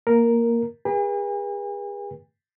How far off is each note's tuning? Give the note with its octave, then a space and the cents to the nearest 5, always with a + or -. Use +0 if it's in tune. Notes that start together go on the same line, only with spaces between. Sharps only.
A#3 +0 A#4 +0
G#4 -40 B4 -40 G#5 -45